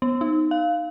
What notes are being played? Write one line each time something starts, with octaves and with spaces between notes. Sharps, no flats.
B3
D#4
F5